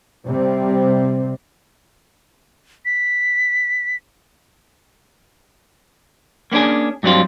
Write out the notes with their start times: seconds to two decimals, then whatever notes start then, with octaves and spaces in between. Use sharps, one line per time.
0.25 C3 G3 C4
2.85 B6
6.52 A#3 B3 C#4 D4 G#4
7.03 G2 F#3 G3 C4 F4